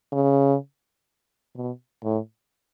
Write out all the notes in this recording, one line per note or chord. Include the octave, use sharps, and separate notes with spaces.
C#3
B2
A2